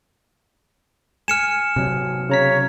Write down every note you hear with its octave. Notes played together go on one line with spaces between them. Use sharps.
G#5 F6 C#7 E7
C3 F#3
C#3 C#5 A#5 B6